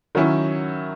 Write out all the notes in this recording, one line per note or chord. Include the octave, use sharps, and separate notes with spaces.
D#3 F#3 C#4 E4